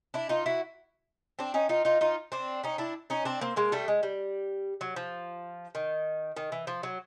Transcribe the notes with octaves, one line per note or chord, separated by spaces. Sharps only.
D4 E4
D#4 F4
E4 F#4
C4 D4
C#4 D#4
D#4 F4
D#4 F4
D#4 F4
C4 D4
C#4 D#4
D4 E4
C#4 D#4
C4 D4
A#3 C4
G#3 A#3
G3 A3
G#3
G3
F#3
F3
D#3
D#3
E3
F3
F#3